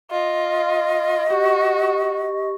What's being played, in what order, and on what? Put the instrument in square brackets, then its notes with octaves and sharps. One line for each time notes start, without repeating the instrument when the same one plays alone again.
[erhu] F4 [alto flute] D#5
[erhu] F#4 [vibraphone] G4 C#6